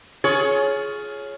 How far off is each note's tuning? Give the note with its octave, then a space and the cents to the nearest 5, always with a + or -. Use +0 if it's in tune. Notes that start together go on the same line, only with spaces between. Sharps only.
F4 +0 G#4 +20 C#5 +0